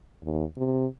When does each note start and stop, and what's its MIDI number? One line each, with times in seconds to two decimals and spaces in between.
0.23 0.43 39
0.57 0.86 48